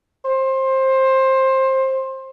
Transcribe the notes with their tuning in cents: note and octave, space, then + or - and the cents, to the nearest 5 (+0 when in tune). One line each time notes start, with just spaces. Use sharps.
C5 +20